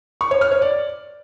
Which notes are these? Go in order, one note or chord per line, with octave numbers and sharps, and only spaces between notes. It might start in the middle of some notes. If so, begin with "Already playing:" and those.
C#6
C#5
F6
C#5
D5